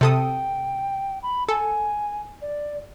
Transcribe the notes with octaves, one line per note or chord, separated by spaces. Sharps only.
C3 A4 G5 D#6
B5
A4 G#5
D5